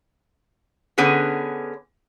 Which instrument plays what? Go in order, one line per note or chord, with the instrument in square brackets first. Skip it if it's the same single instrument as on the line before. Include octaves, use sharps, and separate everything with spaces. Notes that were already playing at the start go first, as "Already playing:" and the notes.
[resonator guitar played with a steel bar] D3 B3 C#4 G#4 B4